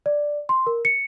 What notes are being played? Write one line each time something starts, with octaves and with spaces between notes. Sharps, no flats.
D5
C6
A#4
C#7